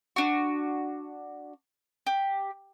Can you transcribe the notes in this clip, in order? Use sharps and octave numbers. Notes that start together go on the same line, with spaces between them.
D4 F#4
G4